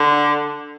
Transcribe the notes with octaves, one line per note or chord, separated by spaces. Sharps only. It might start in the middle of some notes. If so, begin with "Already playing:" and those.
Already playing: D3